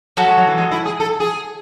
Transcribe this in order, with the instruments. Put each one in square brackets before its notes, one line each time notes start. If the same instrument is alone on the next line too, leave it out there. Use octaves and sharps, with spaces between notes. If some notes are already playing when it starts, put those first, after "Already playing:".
[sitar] F#3 [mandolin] C#4 F#4 A4
[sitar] G#3
F#3
E3
G#3
E4
G#4
A4
G#4